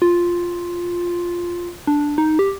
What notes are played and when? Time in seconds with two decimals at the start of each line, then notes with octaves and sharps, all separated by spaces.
0.02 F4
1.87 D4
2.18 D#4
2.39 G4